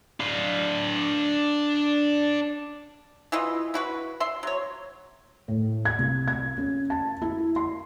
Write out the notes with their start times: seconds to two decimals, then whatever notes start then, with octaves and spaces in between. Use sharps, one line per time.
0.20 D4 F5
3.32 E3 E4 F4 D#5
3.74 E4 F#4 B4
4.20 E5 C6
4.43 F#3 C#5
5.48 A2
5.85 G#6
5.98 C2
6.28 G#6
6.58 C#4
6.90 A5
7.22 E4
7.56 C6